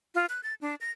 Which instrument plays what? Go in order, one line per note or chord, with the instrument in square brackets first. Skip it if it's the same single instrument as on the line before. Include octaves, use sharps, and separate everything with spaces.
[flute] F4
F#6
A6
D4
A#6